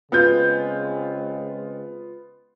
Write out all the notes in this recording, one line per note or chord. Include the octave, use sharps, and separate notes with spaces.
C#3 G#3 B3 C4 F4 G6